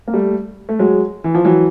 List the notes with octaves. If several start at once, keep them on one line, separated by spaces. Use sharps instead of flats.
A#3
G3 A3
A3
F#3 G#3
E3
F3
E3 F#3